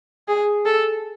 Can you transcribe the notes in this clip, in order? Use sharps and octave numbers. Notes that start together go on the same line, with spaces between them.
G#4
A4